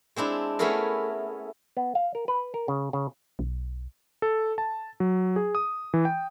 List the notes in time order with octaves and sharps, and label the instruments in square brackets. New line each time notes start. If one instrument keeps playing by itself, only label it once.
[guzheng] G#3 C4 D4 E4
A3 B3 C#4 E4 G#4 A#4
[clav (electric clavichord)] B3
F5
A#4
B4
A#4
C#3
C#3
[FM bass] B1
[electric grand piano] A4
A5
F#3
G#4
D#6
E3
G5